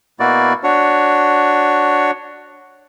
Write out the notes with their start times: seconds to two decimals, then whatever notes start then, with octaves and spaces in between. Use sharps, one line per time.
0.20 B2 A#3 E4 F#4 D5
0.64 D4 F#4 C#5